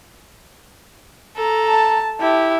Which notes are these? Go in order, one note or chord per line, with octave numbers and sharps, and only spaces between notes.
A4 A#5
A5
E4 G4